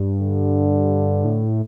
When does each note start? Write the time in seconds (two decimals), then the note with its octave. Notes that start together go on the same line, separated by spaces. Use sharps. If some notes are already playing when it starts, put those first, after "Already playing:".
Already playing: G2
0.20 D3
1.25 A2